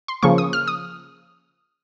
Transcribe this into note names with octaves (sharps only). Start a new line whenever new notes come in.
C6
C#3 F3 A#3 C#6
D#6
F6
D#6